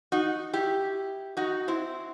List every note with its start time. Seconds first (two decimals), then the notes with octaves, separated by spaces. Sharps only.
0.12 D#4 F#4
0.53 E4 G4
1.37 D#4 F#4
1.68 C4 E4